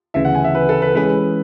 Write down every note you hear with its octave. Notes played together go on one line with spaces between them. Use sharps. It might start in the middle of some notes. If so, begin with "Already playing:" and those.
D2 C#3 E3 E5
F#5
G#5
E5
B4
A4
B4
E3 G#3 C#4 G#4 B4